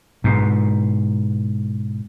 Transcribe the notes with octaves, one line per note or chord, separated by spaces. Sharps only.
G#2 B2